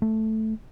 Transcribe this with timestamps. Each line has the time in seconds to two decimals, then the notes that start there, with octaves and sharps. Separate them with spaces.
0.02 A3